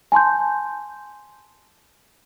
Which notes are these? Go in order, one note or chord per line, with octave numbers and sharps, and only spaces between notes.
G#5 A5 C6 G6